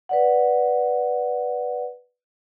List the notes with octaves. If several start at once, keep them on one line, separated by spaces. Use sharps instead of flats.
B4 D5 F#5